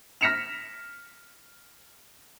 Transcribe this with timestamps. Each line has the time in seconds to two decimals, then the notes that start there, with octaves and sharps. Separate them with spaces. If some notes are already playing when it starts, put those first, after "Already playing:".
0.21 F6 A#6 B6 C#7 E7 F7